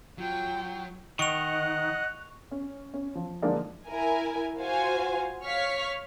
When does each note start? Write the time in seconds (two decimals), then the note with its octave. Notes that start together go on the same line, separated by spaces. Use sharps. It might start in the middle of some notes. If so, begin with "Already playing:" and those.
0.18 F#3 F4 G5
1.19 D#3 D#5 F#5 C#6 F#6 F7
2.51 C#4
2.94 C#4
3.15 F3
3.42 D3 F3 G#3 A#3 D4 D#4
3.88 E4 A#4 G#5
4.58 F4 F#4 C5 F5 G#5
5.44 C#5 F5 C#6 F6 B6